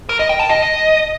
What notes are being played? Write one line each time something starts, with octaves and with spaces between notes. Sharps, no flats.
A#4
D#5
G5
A5
D#5